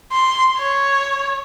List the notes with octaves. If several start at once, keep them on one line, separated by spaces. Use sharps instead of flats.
C6
C#5